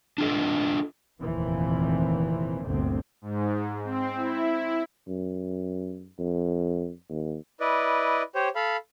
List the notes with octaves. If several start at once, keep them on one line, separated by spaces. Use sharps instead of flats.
D4 F4 A4 D#5
F1 D#2 A#2 E3 F3 C4
G1 D2 A#2 D3 C4
G#2
C4
E4
F#2
F2
D#2
E4 B4 D5 D#5
G4 C5 C#5
A4 F5 B5